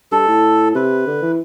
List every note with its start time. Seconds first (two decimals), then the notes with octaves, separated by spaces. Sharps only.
0.12 G2 A4
0.28 A2
0.75 C3 B4
1.07 D3
1.22 E3